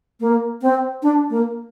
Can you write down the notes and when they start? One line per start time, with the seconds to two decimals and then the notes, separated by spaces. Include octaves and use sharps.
0.20 A#3
0.62 C4
1.03 D4
1.30 A#3